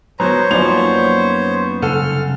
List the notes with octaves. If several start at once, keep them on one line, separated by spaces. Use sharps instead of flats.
F#3 B3 C5 C#5 A#5
F#2 F3 A#3 B3 D#4 D5 F7
C2 C#3 A4 F#5 F6